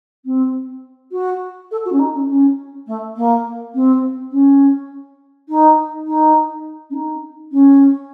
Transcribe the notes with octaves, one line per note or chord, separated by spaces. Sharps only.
C4
F#4
A4
F#4
C#4
D#4
C#4
C#4
A3
A#3
C4
C#4
D#4
D#4
C#4
D#4
C#4